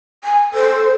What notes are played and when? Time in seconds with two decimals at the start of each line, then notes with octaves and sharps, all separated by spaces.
0.24 G#5
0.54 A4 C5